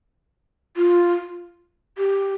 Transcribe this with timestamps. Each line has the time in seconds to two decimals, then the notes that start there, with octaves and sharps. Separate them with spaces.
0.77 F4
1.98 G4